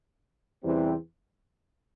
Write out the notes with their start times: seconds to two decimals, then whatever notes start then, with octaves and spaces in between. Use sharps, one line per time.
0.63 E2 C3 E3 G3 C4